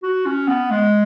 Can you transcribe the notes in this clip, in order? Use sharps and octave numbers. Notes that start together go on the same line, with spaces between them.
F#4
C#4
B3
G#3